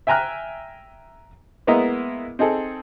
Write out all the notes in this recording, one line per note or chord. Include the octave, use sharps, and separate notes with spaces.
E5 G5 G#5 A#5 F6 F#6
G#3 A#3 B3 E4 D#5 A#5
C4 D#4 G#4 A4